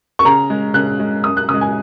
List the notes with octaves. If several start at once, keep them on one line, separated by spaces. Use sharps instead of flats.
C#6
C#3 A#5
G#3
C#3 F#6
G#3
F#2 D#6
F#6
C#3 D#6
G#3
G#5